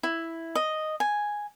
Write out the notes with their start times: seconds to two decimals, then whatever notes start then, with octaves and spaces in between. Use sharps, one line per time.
0.03 E4
0.55 D#5
1.00 G#5